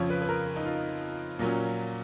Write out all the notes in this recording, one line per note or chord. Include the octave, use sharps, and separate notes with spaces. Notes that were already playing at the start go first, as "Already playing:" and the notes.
Already playing: F2 C#3 F3 C#5
B4
B4
A#4
D#4
F4
A#2 F#3 A#3 C#4